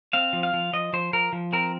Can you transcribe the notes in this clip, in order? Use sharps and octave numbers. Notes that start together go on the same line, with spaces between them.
C4 F5
F3
F5
F3
F3 D#5
F3 C5
F3 A#4
F3
C4 A#4